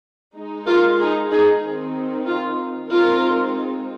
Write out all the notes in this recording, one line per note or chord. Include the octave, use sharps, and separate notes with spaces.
G#3 D#4
F4 A#4
D#4 G#4
D#4 G#4
D#3 C4 D#4
F4
G#3 C4 D#4 F4 A#4